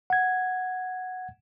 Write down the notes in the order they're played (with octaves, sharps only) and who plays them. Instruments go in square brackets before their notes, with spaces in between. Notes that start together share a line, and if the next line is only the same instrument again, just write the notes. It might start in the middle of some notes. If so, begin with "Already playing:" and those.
[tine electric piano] F#5 G#6